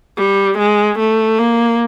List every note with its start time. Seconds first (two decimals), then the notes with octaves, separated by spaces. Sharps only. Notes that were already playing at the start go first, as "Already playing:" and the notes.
0.17 G3
0.58 G#3
0.99 A3
1.39 A#3